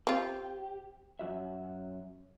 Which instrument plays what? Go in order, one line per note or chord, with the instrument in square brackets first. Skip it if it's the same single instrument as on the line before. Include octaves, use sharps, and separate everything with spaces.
[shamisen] C4 F4 [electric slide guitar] G4
[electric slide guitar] F#2 F#4 E5